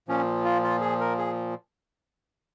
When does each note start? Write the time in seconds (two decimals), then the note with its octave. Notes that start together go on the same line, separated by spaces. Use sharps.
0.08 A#2 F3 C#4
0.45 F4
0.64 F4
0.81 G#4
1.00 A#4
1.18 G#4